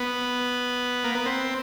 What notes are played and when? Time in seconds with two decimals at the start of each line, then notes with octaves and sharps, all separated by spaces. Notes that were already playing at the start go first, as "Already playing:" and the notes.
Already playing: B3
1.04 A#3
1.15 B3
1.26 C4